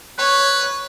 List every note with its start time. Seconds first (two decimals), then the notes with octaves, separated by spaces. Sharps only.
0.18 B4 C#5